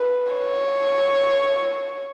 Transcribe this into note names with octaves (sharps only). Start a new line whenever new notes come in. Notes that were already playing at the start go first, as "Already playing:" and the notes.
Already playing: B4
C#5